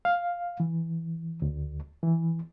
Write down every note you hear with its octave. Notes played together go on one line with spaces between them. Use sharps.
F5
E3
D2
E3